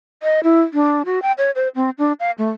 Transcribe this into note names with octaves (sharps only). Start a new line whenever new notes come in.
D#5
E4
D4
F#4
G5
C#5
C5
C4
D4
F5
A3